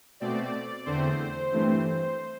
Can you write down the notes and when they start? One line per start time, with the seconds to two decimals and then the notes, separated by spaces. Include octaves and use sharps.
0.20 B2 A3 C4 D5
0.86 E2 D3 A3 C4 C5
1.52 G2 E3 A3 C4 C5